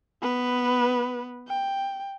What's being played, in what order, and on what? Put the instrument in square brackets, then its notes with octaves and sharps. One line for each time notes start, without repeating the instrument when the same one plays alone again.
[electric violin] B3 B4
G5